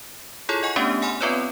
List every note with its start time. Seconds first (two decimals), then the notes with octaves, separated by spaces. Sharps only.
0.49 E4 F4 G#4 A4 C#5
0.63 D#5 F#5 G#5 C#6
0.76 A3 B3 C#4 D4 G4
1.02 F#5 G#5 B5 C6 F6
1.21 B3 C4 F4 B4 C#5 D5